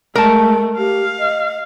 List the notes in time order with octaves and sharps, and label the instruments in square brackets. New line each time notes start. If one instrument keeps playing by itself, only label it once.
[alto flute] G#3 [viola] A3 [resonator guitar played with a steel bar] A#4 A5
[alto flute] G4 [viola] F5
[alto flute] D#5